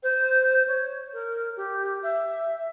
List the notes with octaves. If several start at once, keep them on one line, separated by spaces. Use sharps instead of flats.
C5
C#5
A#4
G4
E5